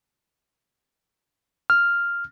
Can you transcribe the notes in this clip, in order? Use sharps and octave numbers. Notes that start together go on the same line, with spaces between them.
F6